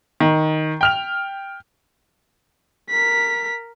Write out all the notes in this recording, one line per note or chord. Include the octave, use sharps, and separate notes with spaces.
D#3
G5 F6 F7
A#4 B6